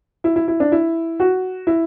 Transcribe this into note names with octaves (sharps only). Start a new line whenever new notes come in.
E4
E4
E4
D4
E4
F#4
E4